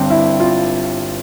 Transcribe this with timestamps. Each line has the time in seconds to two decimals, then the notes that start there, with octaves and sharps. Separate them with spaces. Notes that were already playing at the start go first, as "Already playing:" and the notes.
Already playing: G1 G2 G3 C4
0.10 E4
0.40 F4